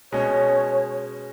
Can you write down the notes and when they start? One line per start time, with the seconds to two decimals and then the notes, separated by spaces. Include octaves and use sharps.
0.12 B2 G#3 C#4 C#5